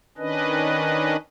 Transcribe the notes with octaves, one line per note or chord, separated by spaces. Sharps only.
D#3 C#4 D4 B4 D#5